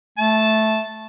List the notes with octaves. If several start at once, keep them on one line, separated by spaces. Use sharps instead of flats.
A3 A5